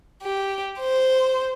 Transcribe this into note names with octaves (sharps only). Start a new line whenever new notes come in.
G4
C5